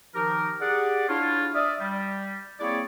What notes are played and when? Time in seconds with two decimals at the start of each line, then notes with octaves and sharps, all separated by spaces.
0.15 D#3 F3 D#4 G4 A#4
0.61 G4 G#4 D5 F#5
1.09 D4 E4 F4 C#5
1.54 D5 E5 D#6 F6
1.80 G3
2.60 A#3 C4 E4 G#4 C#5 D5